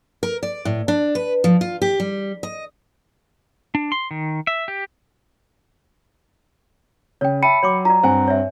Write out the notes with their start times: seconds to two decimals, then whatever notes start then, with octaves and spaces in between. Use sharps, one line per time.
0.23 A#4
0.43 D5
0.65 A2
0.88 D4
1.15 B4
1.44 F3
1.61 F4
1.82 G4
2.00 G3
2.43 D#5
3.75 D4
3.92 C6
4.11 D#3
4.47 E5
4.68 G4
7.21 C#3 C#5 G5
7.43 E5 G5 A5 B5 C#7 D#7
7.63 F#3 C#5 C6 D6
7.85 F4 D5 A#5
8.03 G2 C4 C5 F#5 G#5
8.28 C#5 E5